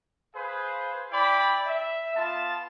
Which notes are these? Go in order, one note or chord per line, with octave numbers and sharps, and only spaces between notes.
G#4 B4 C5 F5
E4 D5 G5 B5
E5
B3 F4 A5